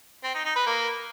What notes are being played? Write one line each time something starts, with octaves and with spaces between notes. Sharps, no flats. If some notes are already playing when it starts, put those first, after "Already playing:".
C4
D#4
D#4
B4
A#3